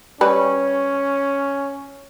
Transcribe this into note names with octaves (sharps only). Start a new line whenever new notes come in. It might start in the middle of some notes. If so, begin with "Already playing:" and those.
G3 C#4 B4